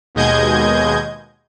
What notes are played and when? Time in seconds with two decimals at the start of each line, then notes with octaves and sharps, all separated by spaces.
0.15 D#2 B2 G#3 D#5 G6 G#6